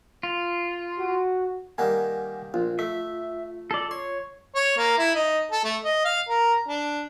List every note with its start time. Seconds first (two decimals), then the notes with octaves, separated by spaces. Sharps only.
0.23 F4
0.99 F#4
1.78 D#3 G3 A#3 F#5 G#5
2.54 A#1 F4
2.79 A3 E5
3.71 A4 D5
3.91 C#5 C6
4.55 C#5
4.77 A#3
4.98 E4
5.15 D#4
5.51 A4
5.64 A3
5.84 D#5
6.05 F5
6.29 A#4
6.68 D4